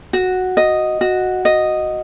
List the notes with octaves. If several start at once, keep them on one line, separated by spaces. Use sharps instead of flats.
F#4
D#5
F#4
D#5